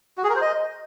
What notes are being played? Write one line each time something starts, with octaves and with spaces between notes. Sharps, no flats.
F#4
G#4
A#4
C5
D#5